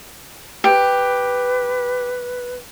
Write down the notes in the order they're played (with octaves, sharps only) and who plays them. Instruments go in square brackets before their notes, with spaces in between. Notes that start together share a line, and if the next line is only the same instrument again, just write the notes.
[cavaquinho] G4 [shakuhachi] B4